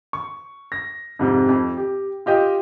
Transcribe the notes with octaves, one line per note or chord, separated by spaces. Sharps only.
C#6
A#6
F2 G#2 C3
F2
G4
F4 G4 D#5 G5